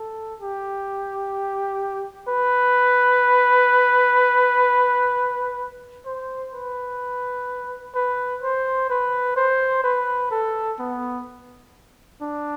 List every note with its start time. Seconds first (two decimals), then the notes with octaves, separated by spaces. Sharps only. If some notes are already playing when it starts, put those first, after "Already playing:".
Already playing: A4
0.40 G4
2.28 B4
6.06 C5
6.54 B4
7.95 B4
8.42 C5
8.90 B4
9.36 C5
9.84 B4
10.31 A4
10.79 B3
12.21 D4